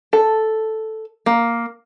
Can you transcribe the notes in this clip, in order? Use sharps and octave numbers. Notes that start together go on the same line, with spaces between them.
A4
A#3